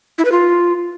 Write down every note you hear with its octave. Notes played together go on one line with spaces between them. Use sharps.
E4
B4
F4